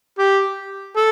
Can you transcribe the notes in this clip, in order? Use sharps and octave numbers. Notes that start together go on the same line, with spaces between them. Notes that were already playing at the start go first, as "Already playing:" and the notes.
G4
A4